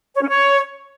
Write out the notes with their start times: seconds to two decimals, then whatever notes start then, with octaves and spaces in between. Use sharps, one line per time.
0.14 C#5
0.21 C#4
0.28 C#5